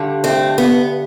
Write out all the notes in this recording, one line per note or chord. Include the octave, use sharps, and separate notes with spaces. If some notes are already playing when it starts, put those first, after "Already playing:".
Already playing: G2 D3 G3
A3 C4
B3